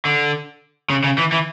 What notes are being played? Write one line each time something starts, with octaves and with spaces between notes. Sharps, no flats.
D3
C#3
C#3
E3
E3